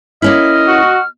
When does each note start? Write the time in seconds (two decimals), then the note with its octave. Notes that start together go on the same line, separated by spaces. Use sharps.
0.22 A#3 C#4 E4 D#5 F6
0.68 F#4